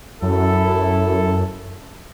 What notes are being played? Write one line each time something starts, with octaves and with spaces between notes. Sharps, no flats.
F#2 E4 A4